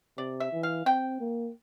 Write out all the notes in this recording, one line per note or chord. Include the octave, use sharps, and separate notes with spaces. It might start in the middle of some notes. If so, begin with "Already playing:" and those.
C3 D5
E5
E3
F5
C4 G5
A#3